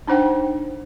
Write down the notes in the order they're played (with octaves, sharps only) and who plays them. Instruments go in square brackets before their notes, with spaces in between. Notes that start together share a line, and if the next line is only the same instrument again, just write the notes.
[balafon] D4 D#4 C5 F#5 G5